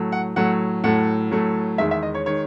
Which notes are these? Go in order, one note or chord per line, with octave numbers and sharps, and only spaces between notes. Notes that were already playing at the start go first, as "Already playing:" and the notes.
Already playing: A2 F#3 A3
F#5
A2 F#3 A3 F#5
A2 F#3 A3 F#5
A2 F#3 A3
E2 D#3 G#3 E5
E5
D#5
C#5
D#3 G#3 C#5